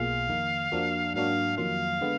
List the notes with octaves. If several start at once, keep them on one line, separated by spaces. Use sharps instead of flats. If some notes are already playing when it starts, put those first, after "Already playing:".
Already playing: B1 B2 A#3 F4 G#4 F5
F2 D#3 A#3
F2 F3 A#3 D4 F#4
G#2 F#3 A#3 D4 F#4 F5
F2 D#3 F#3 A#3 F4 F5
D3 G#3 B3